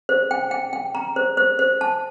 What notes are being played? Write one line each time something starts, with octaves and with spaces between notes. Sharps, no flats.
C5
G5
G5
G5
A#5
C5
C5
C5
A5